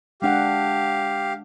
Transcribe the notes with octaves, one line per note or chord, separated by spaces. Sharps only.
G#3 D4 G4 F5 F#5